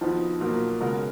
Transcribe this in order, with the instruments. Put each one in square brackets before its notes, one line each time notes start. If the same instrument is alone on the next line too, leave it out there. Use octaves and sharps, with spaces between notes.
[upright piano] F2 F3 B3 D#4 F#4
B2 F#3 A#3 F4 A#4
C#3 G#3 B3 F#4 A#4